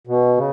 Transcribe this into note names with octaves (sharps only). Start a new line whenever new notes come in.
B2
C#3